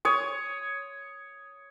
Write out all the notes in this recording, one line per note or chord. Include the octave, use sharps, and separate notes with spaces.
C#5 D#6